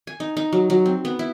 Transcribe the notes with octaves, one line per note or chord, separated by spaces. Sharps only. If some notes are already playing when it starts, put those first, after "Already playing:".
G#5
D#4
D#4
F#3
F#3
C4
B3
E4